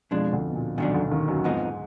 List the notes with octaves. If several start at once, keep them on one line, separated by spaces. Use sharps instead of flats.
F2 B2 F3 G#3 D4
D2 D3
B2
A#2
B1 B2 D#3 F#3 D4
D2 D3
D#2 D#3
F#2 F#3
F2 G#2 F3 G#3 B3 D#4